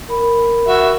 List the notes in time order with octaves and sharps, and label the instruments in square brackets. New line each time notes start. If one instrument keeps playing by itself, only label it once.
[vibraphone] A#4 B5
[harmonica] F#4 E5